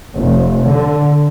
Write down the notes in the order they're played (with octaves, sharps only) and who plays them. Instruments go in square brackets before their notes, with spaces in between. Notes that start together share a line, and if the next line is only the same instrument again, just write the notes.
[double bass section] F1
D3